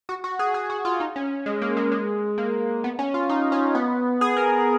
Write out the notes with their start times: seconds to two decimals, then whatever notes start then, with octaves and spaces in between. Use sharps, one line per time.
0.09 F#4
0.24 F#4
0.39 G#4
0.54 G#4
0.70 F#4
0.85 F4
1.00 D#4
1.16 C#4
1.46 G#3
1.62 A#3
1.77 G#3
1.92 G#3
2.38 A#3
2.84 B3
2.99 C#4
3.14 F4
3.29 D#4
3.52 C#4
3.75 B3
4.21 G#4
4.37 A#4